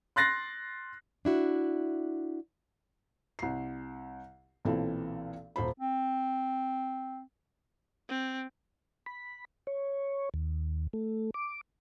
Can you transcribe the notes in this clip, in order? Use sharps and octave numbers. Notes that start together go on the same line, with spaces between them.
C6 F#6 A6 A#6 C7
D4 E4 F#4
C2 C7
B1 A#2 E3 C4 E4 A4
D#1 C5 B5
C4
C4
B5
C#5
D#2
A3
D6